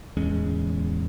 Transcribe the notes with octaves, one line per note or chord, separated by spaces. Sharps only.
D1 E2 G#3 C#4